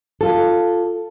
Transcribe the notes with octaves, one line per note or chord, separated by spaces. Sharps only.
F4 A4